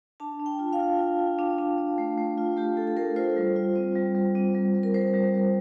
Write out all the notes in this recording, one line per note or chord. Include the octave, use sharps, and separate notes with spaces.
D4 A5
D4
G5
F4
F5
F4
F4
F4
D4
D4
D4
A3
A3
F4
A3 G4
A3 A4
A4
A3 A#4
F4 C5
G3
F4
C4
G3
G3
C4
G3
G3
A#4
G3 C5
G3
G3